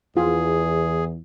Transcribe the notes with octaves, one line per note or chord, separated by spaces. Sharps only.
E2 F4 G#4